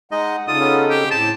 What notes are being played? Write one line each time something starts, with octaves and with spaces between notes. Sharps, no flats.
G#3 D#4 D#5 F#5
C#3 D#4 F4 A4 D5 D#6
B3 C#4 F4
C4 G4 G#4
A2 A5